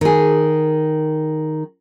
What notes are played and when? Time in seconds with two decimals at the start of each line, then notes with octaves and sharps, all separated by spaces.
0.01 D#3 G#4